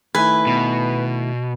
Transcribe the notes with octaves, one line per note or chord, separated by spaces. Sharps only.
D#3 A3 E4 B4 G#5
B2